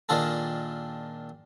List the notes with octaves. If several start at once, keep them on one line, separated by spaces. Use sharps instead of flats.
A#2 D#3 D4 F4 G#4 A4